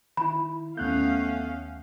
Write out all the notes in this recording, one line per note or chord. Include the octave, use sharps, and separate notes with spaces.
D#3 E4 B5
D#2 A3 B3 C#4 F5 F#6 G6